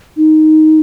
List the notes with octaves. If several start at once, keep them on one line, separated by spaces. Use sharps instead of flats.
D#4